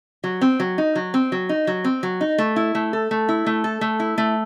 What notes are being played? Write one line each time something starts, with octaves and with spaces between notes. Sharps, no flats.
F#3
C4
F#3
D#4
F#3
C4
F#3
D#4
F#3
C4
F#3
D#4
A3
E4
A3
A4
A3
E4
A3
A4
A3
E4
A3